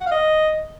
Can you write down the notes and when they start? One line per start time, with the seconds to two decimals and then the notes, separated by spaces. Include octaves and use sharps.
0.01 F#5
0.06 F5
0.11 D#5